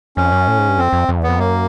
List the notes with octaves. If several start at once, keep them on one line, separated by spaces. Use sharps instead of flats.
F2 C#4
F#2
A2
G#2
G2
F2 C4
F2
F2
E2 B3
F2
F#2 A#3